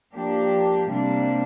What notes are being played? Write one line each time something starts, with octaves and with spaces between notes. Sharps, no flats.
F3 A#3 D4 G4
C3 G3 A#3 D4